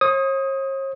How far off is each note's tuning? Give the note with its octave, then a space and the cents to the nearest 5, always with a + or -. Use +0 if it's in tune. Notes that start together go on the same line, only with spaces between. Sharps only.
C#5 -45 D#6 +10